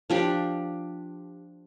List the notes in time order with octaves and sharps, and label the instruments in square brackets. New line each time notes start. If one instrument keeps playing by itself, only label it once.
[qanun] F3 D4 G4